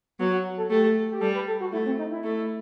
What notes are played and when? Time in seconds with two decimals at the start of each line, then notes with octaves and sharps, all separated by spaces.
0.19 F#3 B3
0.32 F#4
0.57 A4
0.70 A3 G4
1.11 G4
1.21 G3 A4
1.34 B4
1.47 A4
1.60 F#4
1.72 A3 E4
1.86 C4
1.98 D#4
2.11 E4
2.23 A3